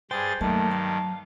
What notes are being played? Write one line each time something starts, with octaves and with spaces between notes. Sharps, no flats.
G2 G#4 C5 G5 A6
G2 D#3 F#3 A3 A#3 A5
F5 A5